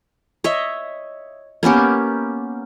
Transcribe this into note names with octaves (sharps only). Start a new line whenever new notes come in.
C#5 D#5 E5
A#3 B3 C#4 G4